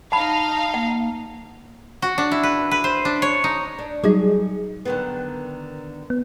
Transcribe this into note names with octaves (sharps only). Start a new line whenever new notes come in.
D#4 F5 F#5 A5 B5
A#3 F#5
F#4
D4
E4
B4
B4
C5
D4
C#5
D#4
D4
F#3 G3 D#4 G#4
D3 D#3 B3
B3